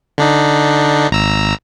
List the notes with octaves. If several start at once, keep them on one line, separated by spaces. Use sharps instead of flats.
D3 D4 D#4
G#1 A#5 E6